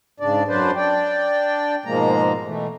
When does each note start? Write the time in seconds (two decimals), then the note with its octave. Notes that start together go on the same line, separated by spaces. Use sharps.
0.20 G#2 C#3 D4 D5
0.48 F#2 F#3 D4 B4 C5 D5
0.75 D4 D5 G5
1.85 G#2 B2 F3 G#3 A#3 A#5
2.44 B2 E3 A3